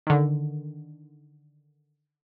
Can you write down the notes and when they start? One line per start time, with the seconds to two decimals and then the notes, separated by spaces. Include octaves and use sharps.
0.07 D3 D#3